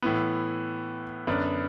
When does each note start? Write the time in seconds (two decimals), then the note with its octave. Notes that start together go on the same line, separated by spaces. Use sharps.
0.02 A2 E3 B3
1.27 F#2 D3 B3 D4